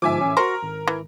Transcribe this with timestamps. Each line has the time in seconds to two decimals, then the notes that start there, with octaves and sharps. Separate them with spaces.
0.02 G1 G#2 F3 E5 G#5 D6
0.21 A1 C#4
0.37 F#4 A#4 C5 C#6 A#6
0.63 G#1
0.87 E3